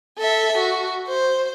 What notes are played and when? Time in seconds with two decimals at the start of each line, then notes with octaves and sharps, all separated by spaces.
0.19 A4 E5
0.58 F#4
1.08 C5